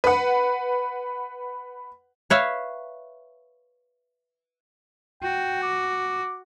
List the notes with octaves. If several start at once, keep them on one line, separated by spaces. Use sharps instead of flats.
B4 F#5
B4 C#5 E5 F5
F#4 G5
D6